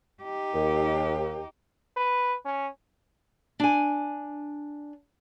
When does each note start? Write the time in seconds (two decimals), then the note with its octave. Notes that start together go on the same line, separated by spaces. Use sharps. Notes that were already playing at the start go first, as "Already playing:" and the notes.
0.23 D#4 G4
0.54 D#2
1.96 B4
2.45 C#4
3.60 D4 G#5